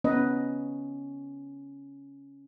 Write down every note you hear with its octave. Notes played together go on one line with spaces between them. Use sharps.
B3 C#4 B4 D#5